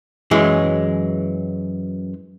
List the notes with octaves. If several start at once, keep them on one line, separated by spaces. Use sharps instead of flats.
F#2 E3 F#3 G#3